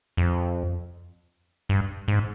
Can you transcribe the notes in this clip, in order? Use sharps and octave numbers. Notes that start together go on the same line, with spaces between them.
F2
G2
G#2